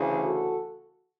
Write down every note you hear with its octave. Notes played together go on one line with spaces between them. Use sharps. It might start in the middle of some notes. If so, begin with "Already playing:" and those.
Already playing: D2 C#3 E3
F#4 A4